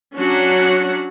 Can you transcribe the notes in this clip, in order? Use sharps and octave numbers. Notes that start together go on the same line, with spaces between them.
F#3 C#4 D4 F#4 F#5